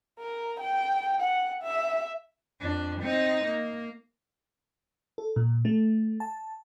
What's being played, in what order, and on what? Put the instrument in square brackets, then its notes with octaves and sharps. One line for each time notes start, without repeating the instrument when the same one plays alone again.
[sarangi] A#4
G5
F#5
E5
[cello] F2 D4
C4 D#4
A#3
[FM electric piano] A4
A#2
A3
A5